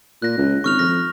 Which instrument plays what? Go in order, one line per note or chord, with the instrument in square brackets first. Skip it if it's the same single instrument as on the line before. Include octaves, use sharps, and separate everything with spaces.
[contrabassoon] A#2 [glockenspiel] F#6 A#6
[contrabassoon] C#2
[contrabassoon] G#1 [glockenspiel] C#6 F6 F7
[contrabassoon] F2 [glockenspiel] A#6